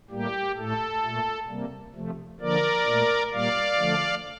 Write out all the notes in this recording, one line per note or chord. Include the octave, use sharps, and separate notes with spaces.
A2 G3 A#3 G4
A2 A3 A4
A#2 A3
C3 G3 A#3
C3 F3 A3
D3 F3 A#3 A#4 D5
A#2 A3
A#2 G3 A#3 D5 F5
D3 F3 A3